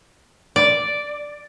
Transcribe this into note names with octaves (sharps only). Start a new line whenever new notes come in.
D5